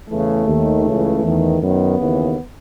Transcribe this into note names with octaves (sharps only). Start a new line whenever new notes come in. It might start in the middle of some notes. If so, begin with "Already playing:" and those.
E2 C#3 E3 A3
D#2 D#3
C#2 C#3 E3
E2 D#3
F#2 D#3 B3
D#2 C#3 E3